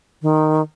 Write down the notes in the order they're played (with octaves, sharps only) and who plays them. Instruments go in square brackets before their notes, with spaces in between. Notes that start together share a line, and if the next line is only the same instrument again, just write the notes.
[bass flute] D#3